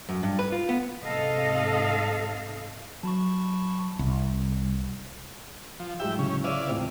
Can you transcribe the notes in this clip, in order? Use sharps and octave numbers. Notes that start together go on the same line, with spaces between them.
F#2
G2
B4
F4
B3
G#2 C3 A4 D#5 F5
F#3 A5 B5 C#6
C2
F3
A2 F#3 G#3 E5 G5
C#3 C#4
E4 C#5 D5 F5 D#7 E7
E1 C#2 C4